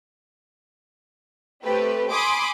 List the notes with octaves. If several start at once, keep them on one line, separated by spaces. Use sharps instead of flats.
A3 C4 G4 B4
G#5 B5 C6 D6 D#6